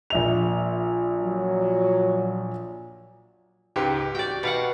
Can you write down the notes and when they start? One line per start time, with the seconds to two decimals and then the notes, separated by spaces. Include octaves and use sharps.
0.10 A#1 E5 F7
1.22 F#3
3.76 C#2 G#2 G4 B4
4.15 F#4 D5 G5
4.43 B2 F5 F#5